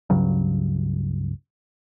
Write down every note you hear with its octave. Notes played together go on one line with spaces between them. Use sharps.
C#2 G2 C#3 F#3